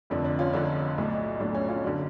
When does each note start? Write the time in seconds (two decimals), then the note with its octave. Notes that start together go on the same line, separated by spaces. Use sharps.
0.10 F1 F2 D3 D4
0.24 D4
0.39 C#4 F4
0.53 F1 F2 D3 D4
0.98 B1 A2
1.40 B1 A2 D4
1.55 C#4
1.69 C#4 F4
1.84 F#1 D3 D4 F#4